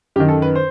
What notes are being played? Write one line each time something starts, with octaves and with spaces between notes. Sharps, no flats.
F#2 D#3 G4
A4
B4
C5